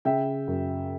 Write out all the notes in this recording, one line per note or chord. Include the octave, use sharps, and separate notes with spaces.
C#3 E5 G5
F#2